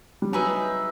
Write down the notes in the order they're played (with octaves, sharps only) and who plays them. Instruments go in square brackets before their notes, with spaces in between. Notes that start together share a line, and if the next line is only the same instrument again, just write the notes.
[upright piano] G3
[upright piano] F#3 [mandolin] D#4 G#4 B4 E5